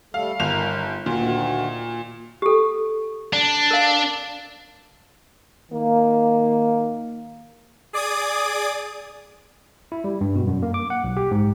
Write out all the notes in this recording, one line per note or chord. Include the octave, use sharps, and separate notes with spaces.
G3 A3 A4 F5
G1 D#3 A#4 F7
D2 A#2 D#3 F#4
G4 A4
D4
A#4 F5
D#3 A#3
G#4 D5 D6 D#6 G#6
E4
G3
G2
B2
F#2
A#3
D6
F#5
B1
G4
G#2